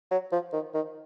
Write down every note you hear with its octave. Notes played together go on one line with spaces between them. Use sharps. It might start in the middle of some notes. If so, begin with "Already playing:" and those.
F#3
F3
D#3
D#3